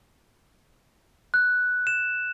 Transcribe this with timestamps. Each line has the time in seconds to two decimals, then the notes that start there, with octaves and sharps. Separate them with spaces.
1.34 F#6
1.87 E7